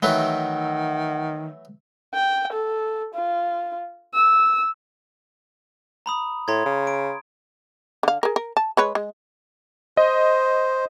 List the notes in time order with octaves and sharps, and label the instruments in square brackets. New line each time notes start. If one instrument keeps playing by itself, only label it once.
[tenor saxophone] D#3 [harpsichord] E3 F#3 A3 [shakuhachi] F#5
[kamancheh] G5
A4
F4
E6
[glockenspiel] A#5 B5 D#6
[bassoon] A2 [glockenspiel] A#5 C6 G#6
[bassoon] C#3
[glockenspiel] D7
[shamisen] D3 F5
G#4 A#4
A#4
A5
G#3 B4 C#5
G#3
[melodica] C5 [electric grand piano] D#5